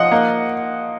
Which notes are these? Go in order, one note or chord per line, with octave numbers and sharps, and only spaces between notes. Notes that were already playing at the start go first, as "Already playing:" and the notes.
Already playing: F3 D#5 F#5
A#3